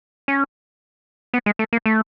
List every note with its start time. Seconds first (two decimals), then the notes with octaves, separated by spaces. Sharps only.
0.28 C#4
1.34 B3
1.46 G#3
1.59 A3
1.73 A#3
1.86 A3